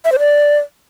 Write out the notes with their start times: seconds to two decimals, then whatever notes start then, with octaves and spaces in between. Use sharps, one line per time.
0.05 E5
0.12 C5
0.19 D5